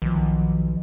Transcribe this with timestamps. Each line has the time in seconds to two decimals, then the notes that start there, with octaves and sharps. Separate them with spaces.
0.02 B1 D#3 F3